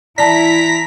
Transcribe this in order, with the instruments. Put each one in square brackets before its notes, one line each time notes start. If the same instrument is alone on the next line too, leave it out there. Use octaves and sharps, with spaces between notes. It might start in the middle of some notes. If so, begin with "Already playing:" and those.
[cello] E3 E4 [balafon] D5 A5 [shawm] A#5 [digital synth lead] B6